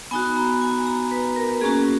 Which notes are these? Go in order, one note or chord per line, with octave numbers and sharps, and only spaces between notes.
B3 D#4 F#4 G#5
A#5
G#5
A#5
B4
A#4
A#3 C#4 F#4 G#4